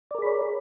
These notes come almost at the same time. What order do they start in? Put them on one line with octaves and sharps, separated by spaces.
D5 A#4 G#4 B5 C#5